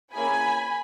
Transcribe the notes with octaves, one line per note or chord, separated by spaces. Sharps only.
A#3 C#4 E4 G#4 G#5 B5